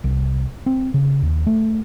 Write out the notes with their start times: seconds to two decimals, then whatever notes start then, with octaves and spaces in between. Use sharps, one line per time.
0.04 C2
0.66 C4
0.94 C#3
1.22 D#2
1.47 A3